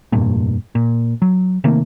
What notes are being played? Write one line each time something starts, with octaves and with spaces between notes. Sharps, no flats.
F1 G2 A#2
A#2
F#3
C3 D#3 A3 A#3